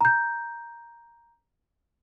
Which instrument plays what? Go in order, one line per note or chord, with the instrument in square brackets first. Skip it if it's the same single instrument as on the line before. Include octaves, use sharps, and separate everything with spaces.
[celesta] A#5 G6